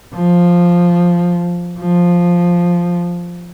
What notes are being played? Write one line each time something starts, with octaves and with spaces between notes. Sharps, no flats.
F3
F3